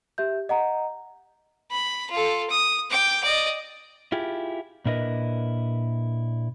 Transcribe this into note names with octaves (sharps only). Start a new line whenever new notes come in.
G4 E5 G6
D#5 F#5 A#5
B5
F4 A4
D#6
G5 D6
D5 D#5
E4 F4 G4 G#4
A#2 D4 E4 A#4 B4 D#5